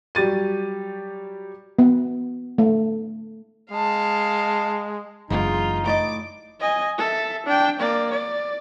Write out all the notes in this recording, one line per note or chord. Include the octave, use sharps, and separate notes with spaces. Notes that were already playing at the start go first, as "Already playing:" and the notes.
F#3 G3 G4 A6 D#7
B3
A3
G#3 F5 A5
F#1 E2 G#2 G#3 D4 D#4 F4
A2 D5 D#5 D6
D#5 G#5
A4 E5
D4 G5
A#3 D5
D5